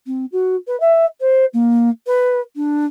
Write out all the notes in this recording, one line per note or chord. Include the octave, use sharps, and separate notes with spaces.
C4
F#4
B4
E5
C5
A#3
B4
D4